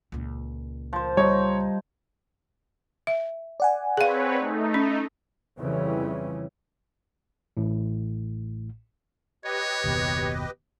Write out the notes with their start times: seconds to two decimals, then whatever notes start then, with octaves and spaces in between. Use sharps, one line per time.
0.12 C#2 A#2
0.93 F3 C5
1.17 G3 D#4 C#5
3.07 E5
3.60 D5 F#5 G#5
3.97 C4 G#4 B4 C#5 F5
4.38 A3 D#4
4.74 C#4
5.60 F2 C#3 E3 G3 C#4
7.57 A1 A2
9.44 G4 B4 C#5 D#5
9.84 F#1 D#2 B2